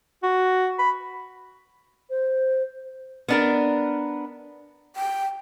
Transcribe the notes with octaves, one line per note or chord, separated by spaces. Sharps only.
F#4
B5
C5
B3 D4 A#4
G5